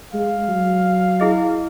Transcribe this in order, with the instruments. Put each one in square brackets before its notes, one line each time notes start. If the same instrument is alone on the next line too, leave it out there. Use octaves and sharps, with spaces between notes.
[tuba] G#3 [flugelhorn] F5
[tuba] F#3
[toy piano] E4 G#4 D#5